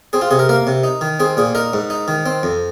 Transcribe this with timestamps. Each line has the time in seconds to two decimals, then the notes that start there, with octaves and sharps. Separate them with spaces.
0.13 C4 G#4
0.21 F4
0.31 C3 G#4
0.39 A#4
0.49 A#3 A#4
0.67 C3
0.84 D#4
1.01 D#3
1.20 C4 G#4
1.37 A#2 G#4
1.55 D#4 A#4
1.73 G#2
1.90 D#4
2.08 D#3
2.26 C4
2.43 F2